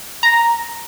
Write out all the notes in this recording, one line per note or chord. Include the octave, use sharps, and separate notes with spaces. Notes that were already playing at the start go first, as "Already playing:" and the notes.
A#5